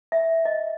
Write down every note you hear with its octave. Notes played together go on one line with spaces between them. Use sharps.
E5
D#5